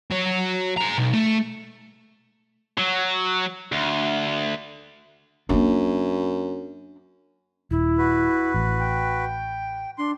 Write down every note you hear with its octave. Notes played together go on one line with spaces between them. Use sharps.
F#3 C#5
G#4 A#5
B1
A3
F#3
D2
F#2 A#3 D4
D#1 E4
F#4 B4
A1
G5
D4 C6